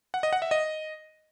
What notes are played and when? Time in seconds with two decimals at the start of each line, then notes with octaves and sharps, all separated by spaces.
0.14 F#5
0.23 D#5
0.33 F#5
0.42 E5
0.51 D#5